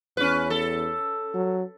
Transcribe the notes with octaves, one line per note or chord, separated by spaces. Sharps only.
E2 C#4 B4
A4
F#3